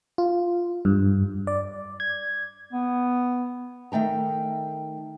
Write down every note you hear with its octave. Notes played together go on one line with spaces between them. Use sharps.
F4
G2
D5
G#6
B3
D#3 A3 G5 A#5